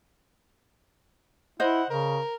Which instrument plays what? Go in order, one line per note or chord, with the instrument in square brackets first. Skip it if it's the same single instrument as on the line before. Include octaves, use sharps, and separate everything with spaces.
[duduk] E4 [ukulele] C5 D#5 [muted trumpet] F#5
[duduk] C#3 [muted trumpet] A#4